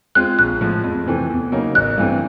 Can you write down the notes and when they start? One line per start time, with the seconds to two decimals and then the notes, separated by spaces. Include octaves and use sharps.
0.15 G#3 C4 F4 F#6
0.39 A#1 F#6
0.61 A2 F3 G#3
0.84 F2
1.06 C3 E3 A3 C4
1.30 E2
1.52 C#3 F#3 A#3 D#4
1.75 A1 F#6
1.98 G2 E3 A3 C4